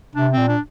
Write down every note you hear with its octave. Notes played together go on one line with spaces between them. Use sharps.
C3 D4
C4
A#2
D4